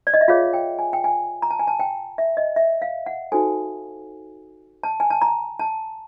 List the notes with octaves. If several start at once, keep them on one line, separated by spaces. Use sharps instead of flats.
D5
D#5
E5
F4 G#4 C#5 F5
G5
G#5
G5
G#5
A#5
A5
G#5
A5
G5
E5
D#5
E5
F5
F#5
D#4 F#4 A4 C5 G#5
A5
G#5
A5
A#5
A5